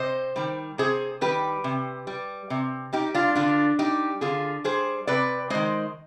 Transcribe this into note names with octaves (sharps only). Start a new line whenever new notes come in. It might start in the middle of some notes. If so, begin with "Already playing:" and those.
Already playing: C3 C5 D#5
D#3 G3
C3 G#4 C5
D#3 G3 G4 B4
C3
G3
C3
G3 D#4 G4
D4 F4
D3 D4 F4
G3 D#4 G4
D3 F4 G#4
G3 G#4 C5
C3 B4 D5
D#3 G#3 C5 D#5